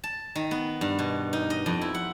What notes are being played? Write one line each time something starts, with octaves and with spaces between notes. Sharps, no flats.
A5
D#3
B3
G2
B2
D#4
D#5
F2
E4
F#5